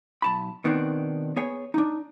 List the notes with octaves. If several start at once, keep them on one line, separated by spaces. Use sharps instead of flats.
B1 A5 B5
B2 D#3 B3 C4 D4
B3 G#4 C#5 G#5
D4 D#4